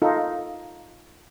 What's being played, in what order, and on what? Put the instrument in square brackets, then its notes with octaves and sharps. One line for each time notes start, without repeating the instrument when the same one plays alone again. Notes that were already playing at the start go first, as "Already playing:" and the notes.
[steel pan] D#4 F4 A4